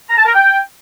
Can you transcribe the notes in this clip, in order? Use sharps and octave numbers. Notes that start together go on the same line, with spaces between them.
A#5
A5
A#4
G5